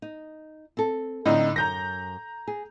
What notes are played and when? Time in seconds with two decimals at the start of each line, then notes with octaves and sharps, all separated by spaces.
0.02 D#4
0.77 C4 A4
1.26 A2 D3 C4 D#4 D5 D#5
1.56 F#2 A#5 G6 A#6
2.48 G#4